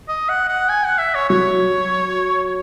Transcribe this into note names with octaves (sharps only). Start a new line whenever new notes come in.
D#5
F#5
F#5
G#5
F#5
E5
C#5
F#3 C#5